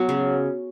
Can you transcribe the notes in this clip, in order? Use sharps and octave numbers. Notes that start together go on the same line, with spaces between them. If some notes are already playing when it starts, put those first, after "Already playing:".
Already playing: F#3 B3
C#3